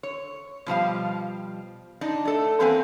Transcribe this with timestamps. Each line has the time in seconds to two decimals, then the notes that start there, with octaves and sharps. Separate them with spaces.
0.03 C#5
0.66 B2 F3 G3 F5
2.01 D4 D#4 D5 D#5
2.25 A3 A4
2.60 E2 A#3 C4 B4 F#5 G#5